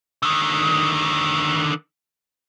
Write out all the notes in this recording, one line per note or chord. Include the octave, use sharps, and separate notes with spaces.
D3 D#3